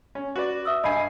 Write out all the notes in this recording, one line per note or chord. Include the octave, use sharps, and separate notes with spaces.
C#4
F#4 B4 D5
E5 D#6 E6
G2 D#5 G#5 B5 C7